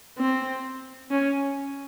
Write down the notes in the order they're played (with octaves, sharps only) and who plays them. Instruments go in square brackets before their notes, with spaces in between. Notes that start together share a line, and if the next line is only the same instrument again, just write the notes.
[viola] C4
C#4